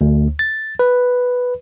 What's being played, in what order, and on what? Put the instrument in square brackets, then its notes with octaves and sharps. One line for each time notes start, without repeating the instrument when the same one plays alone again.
[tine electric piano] D2
A6
B4